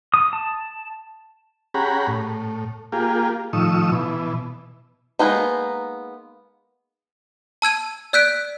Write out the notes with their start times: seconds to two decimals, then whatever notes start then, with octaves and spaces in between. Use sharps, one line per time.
0.14 D#6
0.33 A5
1.74 C#4 G4 G#4 F#5 A#5 B5
2.07 A2
2.92 A#3 F4 G4 G#4
3.53 A2 D#3 F3 C#6 D#6 E6
3.92 B2 E3
5.19 G#3 A#3 B3 D#4
7.62 A5 E6 G#6 D#7
8.13 D5 E6 F#6 G6 B6 D7